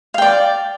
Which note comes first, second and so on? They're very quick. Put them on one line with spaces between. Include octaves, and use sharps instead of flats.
F5 G5 D5